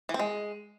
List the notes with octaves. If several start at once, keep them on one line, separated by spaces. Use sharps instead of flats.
E3
C4
G#3